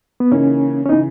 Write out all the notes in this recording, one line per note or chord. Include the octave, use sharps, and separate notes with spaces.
B3
C#3 E3 A#3 C#4 D#4
C#4
C#3 E3 D#4